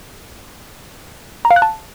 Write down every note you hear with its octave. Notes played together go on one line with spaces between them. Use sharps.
A#5
F5
F#6
A5